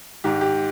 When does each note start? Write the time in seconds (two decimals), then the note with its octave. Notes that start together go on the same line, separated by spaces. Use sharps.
0.24 G#2 D#3 G4
0.41 G4